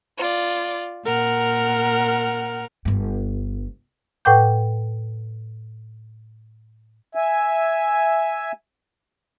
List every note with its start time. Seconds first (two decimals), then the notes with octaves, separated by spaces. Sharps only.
0.19 F4 D5
1.05 A#2 A#4 F#5 F6
2.85 G1 G2
4.25 A2 B4 F#5 G5 D6 G6
7.15 E5 G#5